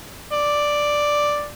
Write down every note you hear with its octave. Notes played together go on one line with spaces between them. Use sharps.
D5